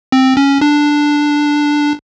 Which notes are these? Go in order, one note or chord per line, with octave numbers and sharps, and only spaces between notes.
C4
C#4
D4